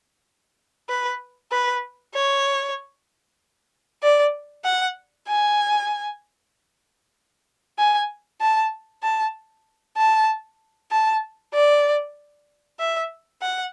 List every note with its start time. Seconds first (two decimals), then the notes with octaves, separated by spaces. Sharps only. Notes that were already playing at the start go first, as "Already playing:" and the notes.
0.89 B4
1.52 B4
2.14 C#5
4.02 D5
4.65 F#5
5.28 G#5
7.78 G#5
8.41 A5
9.03 A5
9.97 A5
10.91 A5
11.54 D5
12.80 E5
13.42 F#5